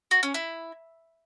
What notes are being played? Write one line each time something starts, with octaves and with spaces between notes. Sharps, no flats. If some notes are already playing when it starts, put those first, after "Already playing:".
F#4
C#4
E4